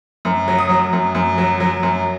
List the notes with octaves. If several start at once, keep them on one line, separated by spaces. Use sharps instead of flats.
F#2
F#3
D#6
F#3
F#2
F#2
F#3
F#3
F#2